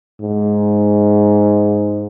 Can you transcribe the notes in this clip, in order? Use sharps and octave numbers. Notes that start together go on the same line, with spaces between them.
G#2